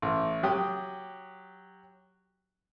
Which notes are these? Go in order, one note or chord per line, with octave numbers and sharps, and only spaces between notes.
A1
F#3 G4 D#6